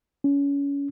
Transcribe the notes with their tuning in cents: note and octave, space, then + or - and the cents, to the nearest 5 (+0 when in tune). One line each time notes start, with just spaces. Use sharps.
C#4 +25